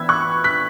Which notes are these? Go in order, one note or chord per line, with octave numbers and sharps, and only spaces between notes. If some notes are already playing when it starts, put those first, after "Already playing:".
Already playing: E3 B3 B5 E6 G#6
C#6 F#6
F#6 B6